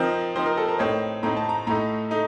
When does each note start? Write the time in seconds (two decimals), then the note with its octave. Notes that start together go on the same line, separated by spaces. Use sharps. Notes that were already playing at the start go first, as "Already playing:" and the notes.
Already playing: F3 C4 D#4 A#4
0.35 F3 C4 D#4 C5
0.46 A#4
0.57 A4
0.68 A#4
0.79 A2 A3 C4 D#4 C#5
1.23 A2 A3 C4 D#4 A#5
1.37 A5
1.49 A#5
1.67 A2 A3 D#4 A#5
2.11 A3 D#4